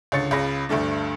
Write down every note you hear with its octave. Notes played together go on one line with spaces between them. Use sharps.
C#2 D3 C#5 A6 C#7
C#2 C#3 B5 A#6
D2 G2 A3 D4